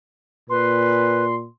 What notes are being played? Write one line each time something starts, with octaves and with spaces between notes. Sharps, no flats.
A#2 B4 C6